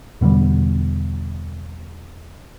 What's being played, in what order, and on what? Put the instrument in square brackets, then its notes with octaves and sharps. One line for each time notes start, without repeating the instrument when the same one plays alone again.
[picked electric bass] E2 B2 D3 G3